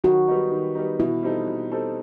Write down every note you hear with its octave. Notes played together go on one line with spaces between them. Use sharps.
D#3 F#4
G3 B3 D#4
D#3
G3 B3 D#4
B2 E4
G3 C4 D#4 A4
B2
G3 C4 D#4 A4